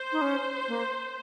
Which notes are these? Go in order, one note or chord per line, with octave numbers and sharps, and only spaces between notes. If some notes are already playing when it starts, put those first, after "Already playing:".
Already playing: C5
D#4
C#4
A#3